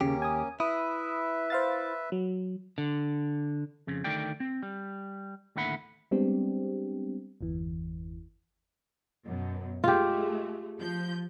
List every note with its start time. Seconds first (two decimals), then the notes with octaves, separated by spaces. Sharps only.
0.01 D#2 C#3 A#3 C#4 G4
0.22 G#5 D#6
0.60 E4 B4 E5 D#6
1.50 C5 F5 A6
2.12 F#3
2.78 D3
3.87 F2 C#3
4.04 D2 D#3 A3 D5 G5
4.40 C4
4.63 G3
5.56 D#2 A2 D3 E5 F#5 B5
6.11 G3 G#3 B3 C4 D4 G4
7.41 G1 E2 E3
9.23 F#2 B2
9.84 G#3 A3 F4 G4
10.78 F3 G6